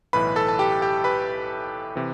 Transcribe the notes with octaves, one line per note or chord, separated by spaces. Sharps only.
B1 A2 E3 B4 B5
A4 A5
A5
G4 G5
G4 G5
B4 B5
C3 E3